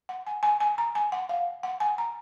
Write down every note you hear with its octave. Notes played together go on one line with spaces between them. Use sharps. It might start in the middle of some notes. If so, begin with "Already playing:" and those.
F#5
G#5
G#5
G#5
A#5
G#5
F#5
F5
F#5
G#5
A#5